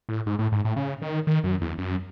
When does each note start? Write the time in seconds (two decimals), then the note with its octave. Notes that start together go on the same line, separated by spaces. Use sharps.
0.09 A2
0.26 G#2
0.39 A2
0.52 G#2
0.65 A2
0.76 C#3
1.02 D#3
1.27 D#3
1.44 F#2
1.61 E2
1.78 F#2